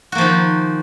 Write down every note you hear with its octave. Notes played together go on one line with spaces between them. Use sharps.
D#3 F3 A#3 F#4